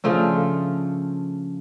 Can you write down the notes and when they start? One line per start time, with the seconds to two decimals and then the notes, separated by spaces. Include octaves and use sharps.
0.04 C#3 F3 A3 D4